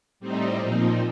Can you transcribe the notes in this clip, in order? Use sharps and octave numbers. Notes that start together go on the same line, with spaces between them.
A2 G3 C4 D#4
A#2 F3 C4 D#4